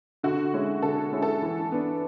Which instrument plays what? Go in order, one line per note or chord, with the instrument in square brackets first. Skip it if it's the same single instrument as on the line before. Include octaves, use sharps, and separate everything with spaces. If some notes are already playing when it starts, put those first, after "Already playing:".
[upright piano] D3 [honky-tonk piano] F#4
[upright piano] G#3 C#4 E4
[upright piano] D3 [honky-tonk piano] A4
[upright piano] G#3 C#4 E4
[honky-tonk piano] A4
[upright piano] E3
B3 D4